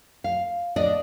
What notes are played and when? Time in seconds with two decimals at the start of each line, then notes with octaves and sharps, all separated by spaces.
0.24 F5
0.76 D4 D5 D#5